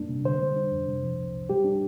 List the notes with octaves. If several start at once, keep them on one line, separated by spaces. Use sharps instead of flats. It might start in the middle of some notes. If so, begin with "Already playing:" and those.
Already playing: F2 G3 A#3 D4
C3
D3 C5
G3
D4
F2
C3
F3
C2
C2
G3 G4
D4